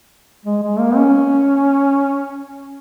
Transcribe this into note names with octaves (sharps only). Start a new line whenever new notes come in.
G#3
G#3
A#3
C#4